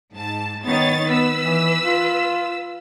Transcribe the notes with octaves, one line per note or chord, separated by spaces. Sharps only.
G#2 A5
D#3 B3 C#5 A6
B3 B4 E6
E3
F4